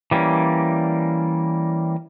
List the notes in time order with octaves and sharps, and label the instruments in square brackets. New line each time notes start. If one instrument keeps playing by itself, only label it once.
[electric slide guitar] E3 G3 A#3 C#4